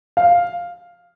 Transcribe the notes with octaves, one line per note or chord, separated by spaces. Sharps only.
F5